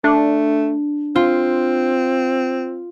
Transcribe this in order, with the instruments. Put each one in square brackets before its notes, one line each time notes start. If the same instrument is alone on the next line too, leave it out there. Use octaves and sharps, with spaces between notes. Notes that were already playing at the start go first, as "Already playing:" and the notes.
[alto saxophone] A3 [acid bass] D4
[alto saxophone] C4 [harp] F4